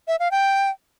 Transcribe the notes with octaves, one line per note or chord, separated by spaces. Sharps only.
E5
F5
G5